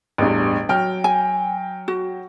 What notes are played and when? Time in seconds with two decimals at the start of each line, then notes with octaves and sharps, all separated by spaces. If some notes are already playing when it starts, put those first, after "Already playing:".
0.18 A1 E2 G2
0.69 F#3 G5 F6
1.04 G#5
1.88 F#4